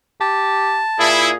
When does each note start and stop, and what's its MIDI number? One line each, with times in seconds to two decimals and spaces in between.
0.21 0.82 67
0.21 1.09 81
0.99 1.35 46
0.99 1.29 64
0.99 1.34 68